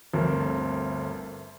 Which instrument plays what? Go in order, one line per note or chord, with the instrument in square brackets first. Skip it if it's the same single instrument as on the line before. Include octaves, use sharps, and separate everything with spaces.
[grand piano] G1 D2 A3 C4 A#4